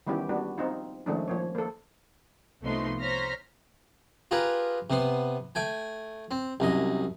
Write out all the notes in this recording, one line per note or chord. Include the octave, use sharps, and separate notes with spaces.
D#3 E3 G3 B3 C#4 G4
G3 A#3 B3 D4 F#4
C4 D#4 F4
D#3 F3 G#3 A3 C#4 D4
F3 A#3 C#5
A#3 A4
C2 F3 A3 B3 D#4 C6
C5 C#5 A#5 F6 A#6 B6
F4 G4 G#4 A#4 B4
C3 B3 C6
A3 G5 G#5
C4
C2 F#2 D#5